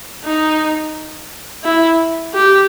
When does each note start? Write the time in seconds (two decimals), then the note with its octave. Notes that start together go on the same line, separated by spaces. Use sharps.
0.25 D#4
1.64 E4
2.34 G4